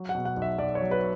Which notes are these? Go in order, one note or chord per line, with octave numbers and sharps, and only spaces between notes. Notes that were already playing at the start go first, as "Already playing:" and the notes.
Already playing: F#3
F#5
B2
F#5
B1
E5
B1 D5
C#5
F#3
B4